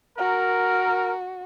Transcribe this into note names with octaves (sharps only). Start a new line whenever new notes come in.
F#4 A#4